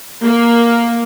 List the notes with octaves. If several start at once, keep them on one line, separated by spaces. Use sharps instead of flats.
A#3